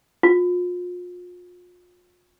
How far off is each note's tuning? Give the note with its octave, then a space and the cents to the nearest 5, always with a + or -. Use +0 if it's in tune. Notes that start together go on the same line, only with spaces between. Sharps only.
F4 +35